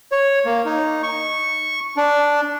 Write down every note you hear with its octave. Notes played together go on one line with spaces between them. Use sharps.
C#5
A#3
D#4
C#6
D4